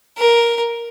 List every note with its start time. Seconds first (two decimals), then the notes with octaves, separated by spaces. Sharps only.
0.18 A#4